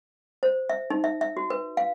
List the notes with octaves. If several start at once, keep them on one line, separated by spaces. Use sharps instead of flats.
C5
E5
D#4
E5
E5
F#4
B4
F5